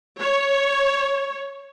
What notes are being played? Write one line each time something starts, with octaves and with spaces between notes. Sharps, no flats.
C#5